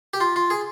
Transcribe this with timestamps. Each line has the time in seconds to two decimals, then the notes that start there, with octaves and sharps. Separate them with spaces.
0.14 G4
0.21 F4
0.36 F4
0.50 G#4